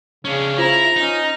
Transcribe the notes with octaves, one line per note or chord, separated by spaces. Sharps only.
C#3 C#4 D4
E4 F4 C5 A#5
C#4 D#4